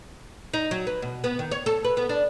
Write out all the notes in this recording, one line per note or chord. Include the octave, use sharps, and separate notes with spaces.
D#4
F#3
B4
B2
B3
D#3
C#5
A4
B4
B3
D4